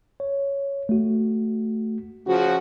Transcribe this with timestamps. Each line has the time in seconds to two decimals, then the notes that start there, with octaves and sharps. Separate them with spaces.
0.20 C#5
0.89 A3 F#4
2.26 C#3 F3 F#4